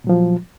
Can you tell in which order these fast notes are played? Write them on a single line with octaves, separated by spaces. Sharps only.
A#2 F#3 F3